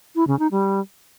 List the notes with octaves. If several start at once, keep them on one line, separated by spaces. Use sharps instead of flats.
E4
C#3
D#4
G3